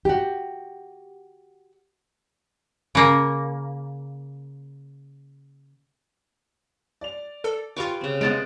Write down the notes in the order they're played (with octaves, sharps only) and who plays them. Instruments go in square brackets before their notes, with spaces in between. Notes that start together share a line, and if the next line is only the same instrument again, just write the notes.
[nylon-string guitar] F#4 G4
[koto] C#3 A#3
[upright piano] D5 F7
[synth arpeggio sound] A4
[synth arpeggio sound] F4 C#6 [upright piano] G4 B4 [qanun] F5 G#5 D6
[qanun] C#3 C4
[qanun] C3 G#4 [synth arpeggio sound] G#3 B3 [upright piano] F#6 A6 D7